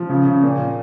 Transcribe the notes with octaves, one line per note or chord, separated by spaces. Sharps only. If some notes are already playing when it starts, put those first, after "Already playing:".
Already playing: F3
C#3
C#3
A#2